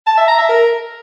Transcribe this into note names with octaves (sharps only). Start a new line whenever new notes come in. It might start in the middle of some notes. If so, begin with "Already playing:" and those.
A5
E5
A#5
E5
A#4